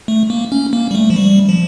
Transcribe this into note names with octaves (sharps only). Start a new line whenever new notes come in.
A3
A#3
C#4
A#3
G3
A3
F3
G3
F3